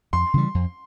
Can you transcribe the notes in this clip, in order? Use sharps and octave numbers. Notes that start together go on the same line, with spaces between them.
F2 C6
C#3 E3 G3
F2